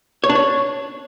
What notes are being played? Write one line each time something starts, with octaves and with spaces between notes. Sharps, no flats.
C#5
D4
C#5